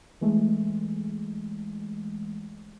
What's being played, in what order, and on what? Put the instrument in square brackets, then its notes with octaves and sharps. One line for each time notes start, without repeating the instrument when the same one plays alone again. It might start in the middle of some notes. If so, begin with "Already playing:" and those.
[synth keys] E3 G#3 A3